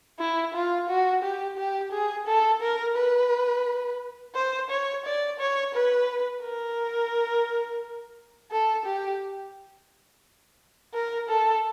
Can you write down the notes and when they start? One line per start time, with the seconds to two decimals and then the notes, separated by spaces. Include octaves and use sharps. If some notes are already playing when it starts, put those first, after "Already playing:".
0.20 E4
0.54 F4
0.89 F#4
1.23 G4
1.57 G4
1.92 G#4
2.27 A4
2.62 A#4
2.96 B4
4.35 C5
4.70 C#5
5.05 D5
5.40 C#5
5.75 B4
6.43 A#4
8.52 A4
8.86 G4
10.94 A#4
11.29 A4